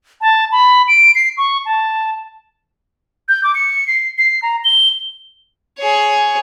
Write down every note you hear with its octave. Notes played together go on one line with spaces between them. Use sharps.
A5
B5
D7
C7
C#6
A5
G6
D6
C#7
C7
C7
A#5
G7
G#4 C#5